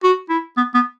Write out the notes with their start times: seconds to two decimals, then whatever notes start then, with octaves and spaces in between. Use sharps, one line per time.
0.04 F#4
0.29 E4
0.57 B3
0.74 B3